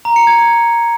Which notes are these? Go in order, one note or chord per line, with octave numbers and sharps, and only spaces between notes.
A#5
C#7
G#6